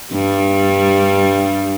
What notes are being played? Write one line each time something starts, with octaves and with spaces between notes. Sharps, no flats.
G2 G3